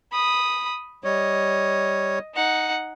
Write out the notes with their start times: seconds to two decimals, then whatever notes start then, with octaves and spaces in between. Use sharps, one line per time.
0.12 B5 D#6
1.04 G3 C#5 D#5
2.34 D#4 F#5